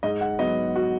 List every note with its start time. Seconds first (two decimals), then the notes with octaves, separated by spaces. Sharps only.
0.03 G#2 D#5
0.21 F#5
0.39 F#3 B3 D#5
0.76 F#4